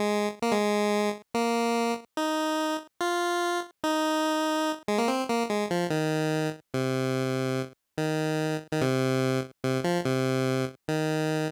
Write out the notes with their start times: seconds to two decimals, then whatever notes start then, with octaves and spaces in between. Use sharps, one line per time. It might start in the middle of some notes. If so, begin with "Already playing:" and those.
Already playing: G#3
0.42 A#3
0.51 G#3
1.34 A#3
2.17 D#4
3.01 F4
3.84 D#4
4.88 G#3
4.98 A#3
5.08 C4
5.29 A#3
5.50 G#3
5.71 F3
5.90 D#3
6.74 C3
7.98 D#3
8.73 D#3
8.81 C3
9.64 C3
9.84 F3
10.06 C3
10.88 D#3